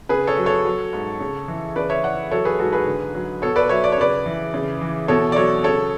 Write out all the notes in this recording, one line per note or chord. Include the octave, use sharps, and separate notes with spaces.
C#3 G#4 B4
A4 C#5
F#3
A4 C#5
F#3
G#2
C#3
E3
C#3 B4 D5
C#5 E5
E3 D5 F#5
F#3 A4 C#5
G#4 B4
G#2 F#4 A4
G#4 B4
D3
F#3
B2 A4 C#5
B4 D5
F#3 C#5 E5
D5
C#5
C#3 B4 D5
E3
C#3
E3
B2 A4 C#5
D5
F#3 A4 C#5
C#3 A4 C#5